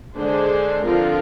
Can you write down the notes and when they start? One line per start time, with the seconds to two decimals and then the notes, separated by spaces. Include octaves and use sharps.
0.17 D3 G#3 D4 G#4 C5
0.85 D3 F3 C4 F4 A#4